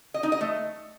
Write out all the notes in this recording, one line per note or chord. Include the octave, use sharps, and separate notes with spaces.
D#5
D#4
D#5
A3